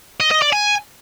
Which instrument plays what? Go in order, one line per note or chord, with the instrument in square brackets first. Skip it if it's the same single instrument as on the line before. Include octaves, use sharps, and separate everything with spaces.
[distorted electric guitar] D#5
D#5
D5
G#5